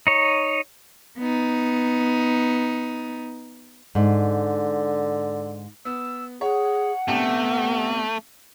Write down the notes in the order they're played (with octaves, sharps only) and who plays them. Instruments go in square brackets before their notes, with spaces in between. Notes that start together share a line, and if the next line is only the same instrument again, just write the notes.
[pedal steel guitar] D#4 C#5
[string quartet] B3 D#4
[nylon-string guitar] G#2 [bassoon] D3
[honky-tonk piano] B3 [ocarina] E6
[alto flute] G#4 [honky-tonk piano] C#5 [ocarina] F#5
[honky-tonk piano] A#1 C3 G5 [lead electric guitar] A3 [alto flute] B3